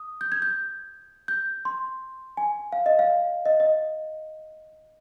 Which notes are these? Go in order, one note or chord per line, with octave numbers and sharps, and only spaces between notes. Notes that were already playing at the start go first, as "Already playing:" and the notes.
Already playing: D#6
G6
G#6
G6
G6
C6
G#5
F5
D#5
F5
D#5
D#5